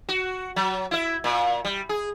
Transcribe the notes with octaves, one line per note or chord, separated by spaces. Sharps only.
F#4
F#3
E4 E5
A#2
G3
G#4